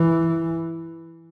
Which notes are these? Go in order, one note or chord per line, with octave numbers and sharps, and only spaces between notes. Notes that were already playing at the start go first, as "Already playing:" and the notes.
Already playing: E3